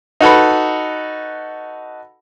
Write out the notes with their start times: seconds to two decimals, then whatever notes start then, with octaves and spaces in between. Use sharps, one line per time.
0.21 D#4 F#4 A4 B4